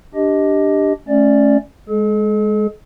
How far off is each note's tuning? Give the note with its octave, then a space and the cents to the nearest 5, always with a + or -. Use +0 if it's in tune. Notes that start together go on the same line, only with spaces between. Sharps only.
D4 +0 G4 +0 D#5 +10
A3 -20 C#4 +0 D5 +0
G#3 +0 A4 -45